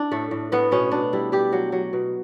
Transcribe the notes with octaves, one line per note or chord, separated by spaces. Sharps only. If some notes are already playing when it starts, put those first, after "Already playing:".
Already playing: D4 E4
A2 A3
A2
A2 B3
B2 C#4
B2 D4
G3 E4
G3 G4
F#3
F#3
B2